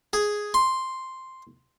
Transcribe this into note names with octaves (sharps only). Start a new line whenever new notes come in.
G#4
C6